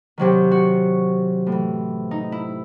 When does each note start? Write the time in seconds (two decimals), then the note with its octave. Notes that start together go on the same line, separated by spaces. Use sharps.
0.18 C3 D#3 F#3 G4
0.51 F#4
1.46 A2
1.52 E3
2.11 D#4
2.32 E4